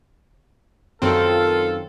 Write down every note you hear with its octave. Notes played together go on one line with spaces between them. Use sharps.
F#2 D#3 C4 F4 A4